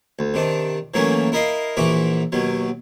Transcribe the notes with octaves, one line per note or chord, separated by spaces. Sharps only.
D2
C3 D#3 D4
E3 F#3 A3 A#3 C#4
E4 A#4 D#5 F5
A#1 A#2 E3 F#4 E5 D6
D#2 B2 F#3